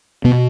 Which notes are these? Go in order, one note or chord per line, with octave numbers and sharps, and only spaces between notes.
B2 B3